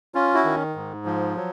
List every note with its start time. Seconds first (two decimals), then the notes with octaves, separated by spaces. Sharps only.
0.15 C#4 F4
0.34 E4 F#4
0.44 D#3
0.75 G#2
1.06 F3
1.36 F#3